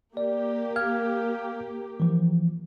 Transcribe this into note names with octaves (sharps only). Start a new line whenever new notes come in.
A#3 G4 D5
F5 F6 G#6
E3 F3